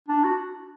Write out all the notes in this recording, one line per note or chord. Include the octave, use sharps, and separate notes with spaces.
D4
F#4